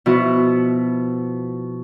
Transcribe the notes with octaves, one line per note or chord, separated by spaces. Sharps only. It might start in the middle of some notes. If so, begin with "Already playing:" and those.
B2 F3 E4 F#4